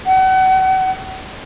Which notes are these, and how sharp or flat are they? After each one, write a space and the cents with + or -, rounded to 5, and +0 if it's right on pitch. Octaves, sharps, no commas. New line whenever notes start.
F#5 +35